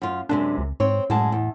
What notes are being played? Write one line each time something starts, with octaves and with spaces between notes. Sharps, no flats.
F#2 F4
F#2 C3 G#3 D4
C#2
G#2 C4 C#5
F#2 A2 G#3 A5
E2